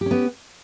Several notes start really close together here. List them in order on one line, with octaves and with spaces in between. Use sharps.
G4 C#4 B3